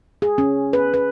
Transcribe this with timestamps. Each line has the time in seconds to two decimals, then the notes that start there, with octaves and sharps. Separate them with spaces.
0.22 G#4
0.38 C#4
0.73 B4
0.94 B4